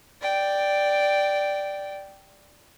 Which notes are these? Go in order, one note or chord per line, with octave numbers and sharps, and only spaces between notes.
D5 G5